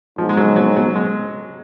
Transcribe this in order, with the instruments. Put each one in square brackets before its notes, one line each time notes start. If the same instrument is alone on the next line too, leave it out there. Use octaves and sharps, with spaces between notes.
[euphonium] G#2 [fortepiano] F3
[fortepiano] G#3
F#3
F#3
F#3
G#3